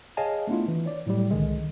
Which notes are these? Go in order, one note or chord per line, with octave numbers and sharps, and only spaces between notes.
G#4 C#5 D#5 F5 G#5 A5
A3 B3 D4 E4 F4
E3
C#5 D5
A2 F#3 G3
C2 D3 D#3 G#3